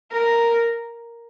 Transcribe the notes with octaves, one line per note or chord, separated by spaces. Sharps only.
A#4